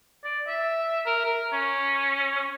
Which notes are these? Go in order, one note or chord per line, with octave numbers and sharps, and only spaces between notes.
D5
E5
A#4
A#4
C#4